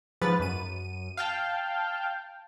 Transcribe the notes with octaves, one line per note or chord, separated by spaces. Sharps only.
G#2 F3 B4 A6
F#2 D#7
F5 G5 A5